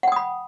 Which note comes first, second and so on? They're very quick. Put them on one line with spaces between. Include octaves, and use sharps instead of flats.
F#5 G5 D#6 B5